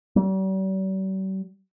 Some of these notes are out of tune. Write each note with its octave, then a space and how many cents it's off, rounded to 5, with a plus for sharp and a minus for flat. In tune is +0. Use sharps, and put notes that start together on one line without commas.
G3 -45